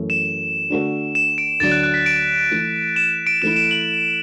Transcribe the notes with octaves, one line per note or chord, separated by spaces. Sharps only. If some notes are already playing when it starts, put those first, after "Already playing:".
Already playing: F#2 E3 A3
E7
D3 A3 F#4 A4
E7
D7
D2 D3 F#3 D4 A6
F#6
F#6
B6
D7
E3 A3 E4 A4
E7
D7
E3 A3 E4 E7
E7
F#7